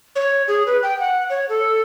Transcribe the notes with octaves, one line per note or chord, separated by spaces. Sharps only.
C#5
G#4
B4
G5
F#5
C#5
A4